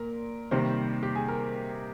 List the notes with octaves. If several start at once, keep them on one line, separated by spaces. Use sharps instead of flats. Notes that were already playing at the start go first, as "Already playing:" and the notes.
Already playing: A#2 A#4
C3 D#3 G3 A#3 C5
G4
G#4
A#4